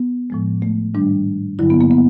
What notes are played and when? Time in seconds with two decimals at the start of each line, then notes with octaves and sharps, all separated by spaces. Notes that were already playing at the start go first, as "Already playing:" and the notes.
Already playing: B3
0.30 A2 F3 G#3
0.62 A3
0.95 G#2 D#3 G3 D4
1.59 G2 D3 F#3 E4
1.70 B3
1.81 A#3
1.91 B3